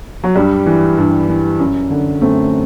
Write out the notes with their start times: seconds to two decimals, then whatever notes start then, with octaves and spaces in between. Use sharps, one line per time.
0.24 F#3
0.35 G2 G3
0.66 E3
0.98 G2
1.28 E3
1.59 F#2
1.90 D3
2.21 F#2 A3 C4